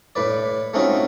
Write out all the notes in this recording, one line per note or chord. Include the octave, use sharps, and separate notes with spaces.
A2 B4 D5
A3 C4 C#4 D#4 F4 F#4